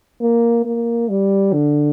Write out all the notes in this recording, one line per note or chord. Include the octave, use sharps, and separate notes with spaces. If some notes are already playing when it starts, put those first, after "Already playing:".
A#3
A#3
G3
D3